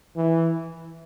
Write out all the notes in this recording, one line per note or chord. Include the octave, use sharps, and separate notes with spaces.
E3